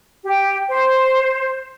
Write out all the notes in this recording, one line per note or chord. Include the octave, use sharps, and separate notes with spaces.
G4
C5